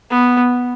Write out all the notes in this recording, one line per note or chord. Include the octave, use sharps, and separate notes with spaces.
B3